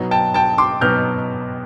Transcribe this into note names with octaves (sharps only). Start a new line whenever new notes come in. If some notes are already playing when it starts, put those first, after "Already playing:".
Already playing: B2 F#3 B3 D#4
G5 A5
G5 A5
C6 D6
B2 F#3 B3 D#4 F6 G6